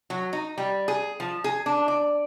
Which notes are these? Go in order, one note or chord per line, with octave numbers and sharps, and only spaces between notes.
F#3
D#4
G3
G#4
F3
G#4
D4
D5